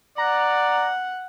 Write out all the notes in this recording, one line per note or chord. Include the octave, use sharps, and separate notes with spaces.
D5 F#5 A#5